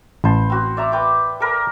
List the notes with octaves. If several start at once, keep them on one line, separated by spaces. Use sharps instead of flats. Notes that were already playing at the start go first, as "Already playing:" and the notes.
A1 B4 C5 A5
C4 F#4
D5 E5 A#5
B4 G5 D6
A4 A#4 B5